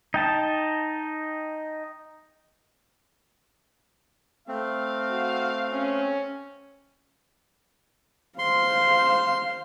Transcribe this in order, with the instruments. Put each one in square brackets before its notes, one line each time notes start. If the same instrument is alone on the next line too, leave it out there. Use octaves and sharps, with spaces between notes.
[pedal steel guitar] D#4 G5 A5
[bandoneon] A3 C4 [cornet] F5
[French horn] F#4
C#4
[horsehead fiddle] C5 F5 [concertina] C6